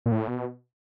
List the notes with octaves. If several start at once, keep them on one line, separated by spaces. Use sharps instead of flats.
A#2
A2
B2